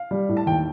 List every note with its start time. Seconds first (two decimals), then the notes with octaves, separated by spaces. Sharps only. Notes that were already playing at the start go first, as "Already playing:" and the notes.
Already playing: F5
0.11 G3
0.29 A2
0.37 A5
0.46 D#2 G5